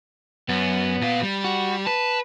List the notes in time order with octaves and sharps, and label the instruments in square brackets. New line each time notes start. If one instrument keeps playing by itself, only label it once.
[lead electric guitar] F#2 [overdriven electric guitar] B3
[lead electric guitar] A#2 F5
G3
[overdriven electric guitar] F#4
[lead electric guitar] B4 [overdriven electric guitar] A5